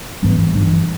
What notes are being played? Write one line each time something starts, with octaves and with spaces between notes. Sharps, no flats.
G#2 E3 G3 B3
G2 E3 G3